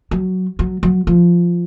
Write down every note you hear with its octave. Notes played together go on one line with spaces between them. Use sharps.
F#3
F#3
F#3
F3